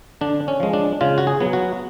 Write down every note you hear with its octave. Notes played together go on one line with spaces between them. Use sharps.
D3 D4
C#4
F3 G#3
D4
C#3 F4
F#4
G#4
F#3 B3
F#4